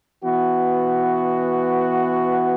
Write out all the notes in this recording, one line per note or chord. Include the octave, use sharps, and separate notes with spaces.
E3 B3 F#4